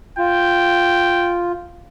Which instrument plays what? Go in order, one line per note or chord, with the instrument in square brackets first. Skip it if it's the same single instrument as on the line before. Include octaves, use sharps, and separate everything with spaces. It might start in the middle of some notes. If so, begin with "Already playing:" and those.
[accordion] F4 [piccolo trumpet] G5